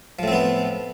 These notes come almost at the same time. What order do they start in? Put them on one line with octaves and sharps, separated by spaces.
F3 A2 C4 B3